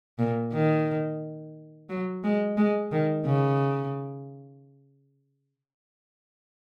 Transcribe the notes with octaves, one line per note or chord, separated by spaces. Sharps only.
A#2
D#3
F#3
G#3
G#3
D#3
C#3